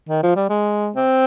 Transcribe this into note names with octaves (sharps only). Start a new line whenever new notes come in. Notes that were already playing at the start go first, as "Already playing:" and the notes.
D#3
F3
G3
G#3
C4